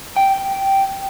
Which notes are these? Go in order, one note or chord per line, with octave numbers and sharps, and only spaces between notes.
G5